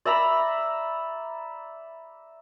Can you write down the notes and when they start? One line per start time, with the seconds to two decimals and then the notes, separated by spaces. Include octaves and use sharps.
0.05 D5 E5 A#5 B5